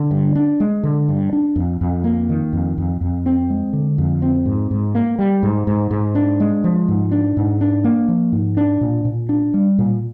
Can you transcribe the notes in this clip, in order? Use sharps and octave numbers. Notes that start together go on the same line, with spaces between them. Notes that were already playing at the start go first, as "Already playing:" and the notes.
Already playing: D3
G2
D4
G#3
D3
G2
D4
F2
F2
A#3
D#3
F2
F2
F2
C4
G#3
D3
F2
C4
G#2
G#2
A#3
G3
G#2
G#2
G#2
D4
G#3
F3
G#2
D4
G#2
D4
A#3
F3
G#2
D4
A#2
A#2
D4
G3
A#2